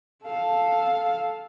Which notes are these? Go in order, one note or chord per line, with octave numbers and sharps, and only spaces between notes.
A4 F5